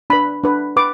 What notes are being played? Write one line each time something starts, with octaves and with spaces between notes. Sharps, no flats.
D4 B4 B5
D4 B4
B4 D6